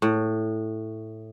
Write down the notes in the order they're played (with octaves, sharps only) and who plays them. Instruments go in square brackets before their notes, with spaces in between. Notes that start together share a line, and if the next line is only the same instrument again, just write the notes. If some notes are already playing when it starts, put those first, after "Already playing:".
[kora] A2